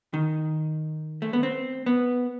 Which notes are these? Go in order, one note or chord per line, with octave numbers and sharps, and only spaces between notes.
D#3
A3
B3
C4
B3